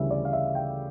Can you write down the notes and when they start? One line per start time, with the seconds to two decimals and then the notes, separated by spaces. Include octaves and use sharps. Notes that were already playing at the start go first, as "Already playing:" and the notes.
Already playing: D2 C#3 E3 G3 E5
0.11 D5
0.25 F5
0.33 E5
0.55 G5